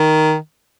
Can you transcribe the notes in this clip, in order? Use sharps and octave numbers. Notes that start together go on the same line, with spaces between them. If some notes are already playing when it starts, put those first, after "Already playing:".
Already playing: D#3